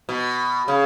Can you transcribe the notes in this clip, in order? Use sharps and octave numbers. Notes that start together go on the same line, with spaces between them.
B2
C#3